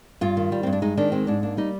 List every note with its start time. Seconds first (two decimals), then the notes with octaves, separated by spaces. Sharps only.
0.21 G2 F4
0.37 D#3
0.52 G3
0.63 G2 C4
0.73 D4
0.82 G#3 D#4
0.97 D#3 D4
1.12 G#3 C4
1.27 G#2 D4
1.43 A#3 D4
1.57 G3 D#4